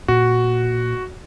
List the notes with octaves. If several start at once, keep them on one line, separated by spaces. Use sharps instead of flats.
A#2 F#4